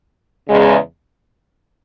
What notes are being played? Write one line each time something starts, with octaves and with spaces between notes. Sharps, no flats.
E2 C#3 G#3